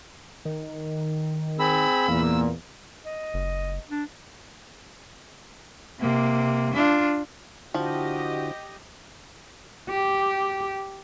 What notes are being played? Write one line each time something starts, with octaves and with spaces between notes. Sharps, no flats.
D#3
C4 G#4 B5 E6
E2 A#2 A#3 E6
D#5
F#1
D4
C3 A#3
D4 F4
D3 F3 D4 E4 F#4 G4 D#5
G4